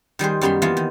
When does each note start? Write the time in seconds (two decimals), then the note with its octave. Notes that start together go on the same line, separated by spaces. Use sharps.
0.19 D#3 G3 G#4 C5
0.41 F#2 G3 B3 B5 C6
0.62 E3 A#3 B3 F4
0.77 D#3